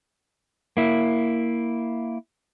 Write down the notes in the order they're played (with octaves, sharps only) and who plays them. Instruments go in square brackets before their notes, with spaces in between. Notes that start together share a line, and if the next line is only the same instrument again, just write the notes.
[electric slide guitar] A#3 E4